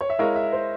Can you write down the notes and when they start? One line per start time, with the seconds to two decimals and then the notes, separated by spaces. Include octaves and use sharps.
0.01 C#5
0.10 E5
0.19 G#3 E4 A#4 C#5 F5
0.36 E5
0.53 C5